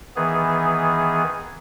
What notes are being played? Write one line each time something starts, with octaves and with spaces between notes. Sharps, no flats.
D#3 E3 B3 G#4